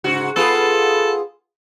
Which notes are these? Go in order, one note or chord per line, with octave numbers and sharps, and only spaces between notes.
G#2 C#3 F#4
B3 F4 G#4 A4